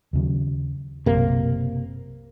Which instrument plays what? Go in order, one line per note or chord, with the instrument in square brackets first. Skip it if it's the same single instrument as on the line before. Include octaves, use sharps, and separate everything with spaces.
[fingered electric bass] D#2 C#3 F#3
[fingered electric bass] F#1 B1 [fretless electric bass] C3 A#3